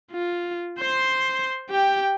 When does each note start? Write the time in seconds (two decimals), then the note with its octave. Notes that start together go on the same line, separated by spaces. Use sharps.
0.12 F4
0.80 C5 C6
1.71 G4 G5